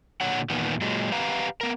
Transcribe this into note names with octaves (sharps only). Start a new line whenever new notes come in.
A#2 D3 C#5 F#5
E2 A#2 D#3 B3
A#2 F#3 G#3
G4 B4 F5 F#5 A#5
B3 A#4